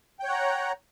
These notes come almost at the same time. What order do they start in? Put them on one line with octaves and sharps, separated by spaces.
G5 C#5 F#5 A#5